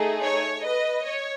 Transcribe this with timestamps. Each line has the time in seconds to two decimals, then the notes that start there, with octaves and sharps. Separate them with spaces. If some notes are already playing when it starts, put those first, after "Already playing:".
Already playing: A3 D#4 G#4
0.22 C#5
0.64 B4 D#5
1.05 C#5